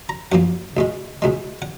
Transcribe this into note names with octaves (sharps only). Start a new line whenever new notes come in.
A#5
F#2 F3 A#3 F#5
C#2 B2 G#3
C#2 B2 G#3
F#5